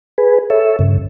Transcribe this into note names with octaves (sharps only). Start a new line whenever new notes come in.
G#4 B4
A4 C#5 E5
G2 C#3